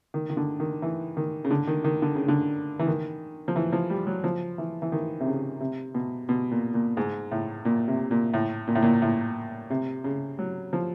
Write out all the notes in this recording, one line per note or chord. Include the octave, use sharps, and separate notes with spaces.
D#3
D#3
D3
D#3
E3
D#3
C#3
D3
D#3
D#3
D3
C#3
D3
E3
D#3
F3
E3
F3
G3
F#3
F3
E3
E3
D#3
C3
C#3
C3
B2
B2
A#2
A#2
G#2
A2
A#2
C3
A#2
A2
A#2
A2
A#2
A2
C3
C#3
F#3
F3